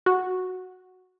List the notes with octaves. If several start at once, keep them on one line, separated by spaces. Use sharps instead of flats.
F#4